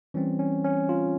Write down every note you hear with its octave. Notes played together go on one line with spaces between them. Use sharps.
E3 G3 C4 C#4
C#4
C#4
F4